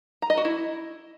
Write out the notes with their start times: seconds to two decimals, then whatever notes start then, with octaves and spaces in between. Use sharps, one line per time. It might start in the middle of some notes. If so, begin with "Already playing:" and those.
0.22 A#5
0.30 D#5
0.37 F#4
0.45 E4